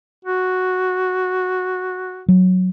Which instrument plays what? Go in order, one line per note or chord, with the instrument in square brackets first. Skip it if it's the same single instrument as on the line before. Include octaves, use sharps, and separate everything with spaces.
[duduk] F#4
[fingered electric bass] F#3